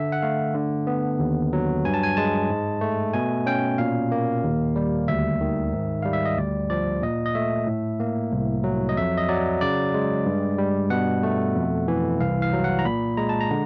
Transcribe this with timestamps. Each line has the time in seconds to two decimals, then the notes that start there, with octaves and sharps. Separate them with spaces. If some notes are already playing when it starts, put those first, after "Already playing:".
Already playing: D3 E5
0.12 F#5
0.23 A3 F5
0.55 D3
0.87 B3
1.19 D#2
1.53 F#3
1.85 G2 G#5
1.94 A5
2.03 G#5
2.17 G#3 A5
2.50 G#2
2.81 A3
3.13 B2 G#5
3.46 C#4 G5
3.78 A#2 F5
4.12 A#3
4.44 D#2
4.76 G3
5.08 D2 E5
5.41 D#3
5.72 G#2
6.02 G3 F5
6.13 E5
6.25 D#5
6.37 D2 D5
6.70 F3 D5
7.02 A#2 D#5
7.26 D#5
7.35 A3 E5
7.67 A2
8.00 A#3
8.32 C2
8.64 F#3
8.89 D#5
8.97 F2 E5
9.17 D#5
9.29 F#3 D5
9.61 C#3 D5
9.94 G#3
10.26 G2
10.58 G3
10.90 B2 F#5
11.23 A3
11.55 F2
11.88 E3
12.20 C2 F5
12.42 F5
12.53 F#3
12.64 F#5
12.79 A#5
12.85 A#2 B5
13.17 G#3 A#5
13.29 A5
13.41 A#5
13.50 D3